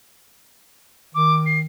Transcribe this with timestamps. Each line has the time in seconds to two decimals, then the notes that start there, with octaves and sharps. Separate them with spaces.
1.14 D#3 D6
1.46 C7